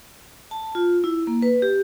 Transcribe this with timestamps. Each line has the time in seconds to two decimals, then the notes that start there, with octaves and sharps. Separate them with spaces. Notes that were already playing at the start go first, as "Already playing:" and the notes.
0.51 A5
0.75 F4
1.04 E4
1.27 A#3
1.42 B4
1.62 G4